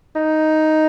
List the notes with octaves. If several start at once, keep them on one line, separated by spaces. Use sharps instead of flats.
D#4